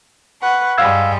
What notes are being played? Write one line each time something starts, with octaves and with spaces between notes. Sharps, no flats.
B4 F#5 C#6
G2 G3 G#3 F5 E6 G#6